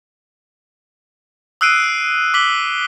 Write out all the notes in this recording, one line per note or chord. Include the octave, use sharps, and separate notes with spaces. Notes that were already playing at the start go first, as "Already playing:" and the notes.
D#6 E6 F#6 C7 D7 D#7
D6 B6 F#7 G7